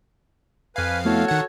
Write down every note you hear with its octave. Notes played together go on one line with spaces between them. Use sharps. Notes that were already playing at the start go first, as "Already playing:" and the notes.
F2 B4 F5 G#5 B5
A3 B3 E4 F#4 A4 C#5
D#3 F#5 G#6